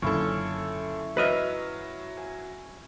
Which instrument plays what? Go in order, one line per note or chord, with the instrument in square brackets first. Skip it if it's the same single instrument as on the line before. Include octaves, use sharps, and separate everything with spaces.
[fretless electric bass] F#1 F#2 D3 [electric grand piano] A#2 A4 [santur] C#4 E4
[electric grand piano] F#3 F6 [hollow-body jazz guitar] B4 D#5 E5
[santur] G#5